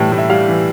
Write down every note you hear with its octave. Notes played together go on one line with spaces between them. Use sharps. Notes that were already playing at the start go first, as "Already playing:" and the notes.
Already playing: A2 E3 G3
A2
E5
G3 F5
E3